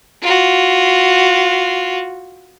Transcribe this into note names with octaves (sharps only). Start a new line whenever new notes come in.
F4 F#4